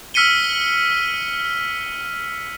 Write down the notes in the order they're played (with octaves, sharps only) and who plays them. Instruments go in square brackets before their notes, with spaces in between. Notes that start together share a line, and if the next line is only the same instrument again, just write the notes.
[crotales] E6 F6 B6 C#7 D#7 G7